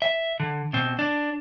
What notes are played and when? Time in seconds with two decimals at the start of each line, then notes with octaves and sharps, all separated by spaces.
0.02 E5
0.40 D3
0.73 B2 C4
0.99 D4